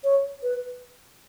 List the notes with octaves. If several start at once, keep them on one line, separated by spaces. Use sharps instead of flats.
C#5
B4